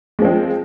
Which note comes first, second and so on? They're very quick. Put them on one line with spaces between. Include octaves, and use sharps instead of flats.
G#3 F3 C4